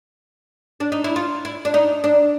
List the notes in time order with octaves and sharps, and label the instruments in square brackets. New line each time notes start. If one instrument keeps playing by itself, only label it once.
[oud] D4
D#4
E4
F4
E4
D4
D#4
D4